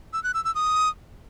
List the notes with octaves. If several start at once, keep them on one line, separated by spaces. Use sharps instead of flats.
E6
F#6
E6
E6
D#6